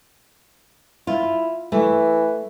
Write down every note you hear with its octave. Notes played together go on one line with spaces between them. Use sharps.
E4 F4
E3 A3